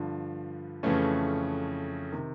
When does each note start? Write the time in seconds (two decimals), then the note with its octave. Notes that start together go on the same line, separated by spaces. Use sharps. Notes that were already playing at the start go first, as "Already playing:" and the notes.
Already playing: G2 D3 F3
0.83 F2 C#3 E3 A3 C#4
2.12 C3 D#3